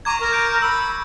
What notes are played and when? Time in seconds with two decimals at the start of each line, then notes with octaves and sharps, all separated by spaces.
0.05 A#5 C#6 D6 G#6
0.20 A#4
0.33 G6 D7
0.62 B5 E6